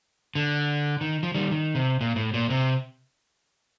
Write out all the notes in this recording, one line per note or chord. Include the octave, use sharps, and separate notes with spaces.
D3
D#3
F3
D#3 G3
D#3
C3
A#2
A2
A#2
C3